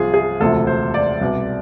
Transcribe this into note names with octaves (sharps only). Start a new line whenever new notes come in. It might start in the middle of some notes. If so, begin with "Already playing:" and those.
Already playing: C2 C3 F3 F4 G#4
G#4
E1 D2 C3 F3 A4
C5
D5
C2 B2